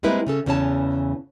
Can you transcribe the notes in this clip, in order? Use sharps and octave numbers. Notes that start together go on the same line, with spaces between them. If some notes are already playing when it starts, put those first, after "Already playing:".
G3 G#3 A#3 C4 E4 B4
C#3 C#4 A4
E2 C#3 E3 C#4 C#5 A5